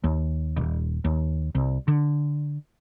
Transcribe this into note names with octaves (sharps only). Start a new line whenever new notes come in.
D#2
D#1
D#2
C2
D3